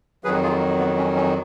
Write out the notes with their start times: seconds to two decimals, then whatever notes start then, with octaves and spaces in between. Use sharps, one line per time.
0.24 F2 D#3 F#3 G#4 B4
0.43 F4 G#4
0.79 B3
0.97 C#4
1.16 C#4